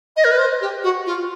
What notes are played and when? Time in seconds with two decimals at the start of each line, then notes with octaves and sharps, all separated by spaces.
0.16 D#5
0.24 A#4
0.31 B4
0.38 C5
0.61 G4
0.83 F#4
1.06 F4